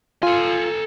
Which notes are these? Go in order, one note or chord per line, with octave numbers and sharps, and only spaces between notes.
F4 A4 G#5